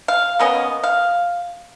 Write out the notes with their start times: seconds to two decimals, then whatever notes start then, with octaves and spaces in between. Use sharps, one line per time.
0.08 F5
0.39 A#3 B3 C#4 D#5
0.83 F5